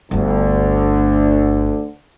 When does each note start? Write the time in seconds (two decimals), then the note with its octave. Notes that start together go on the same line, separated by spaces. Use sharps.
0.11 G1 D2 D3 B3